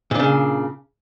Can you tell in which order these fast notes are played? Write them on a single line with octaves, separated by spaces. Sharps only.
A#2 D4 C#3